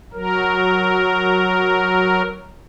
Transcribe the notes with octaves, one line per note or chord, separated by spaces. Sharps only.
F#3 A#4